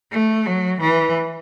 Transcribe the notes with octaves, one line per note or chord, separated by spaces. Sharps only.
A3
F#3
E3